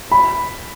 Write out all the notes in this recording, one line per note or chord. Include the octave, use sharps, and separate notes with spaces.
B5